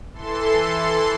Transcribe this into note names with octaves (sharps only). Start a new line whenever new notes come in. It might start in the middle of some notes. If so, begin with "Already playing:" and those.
E3 A4 C6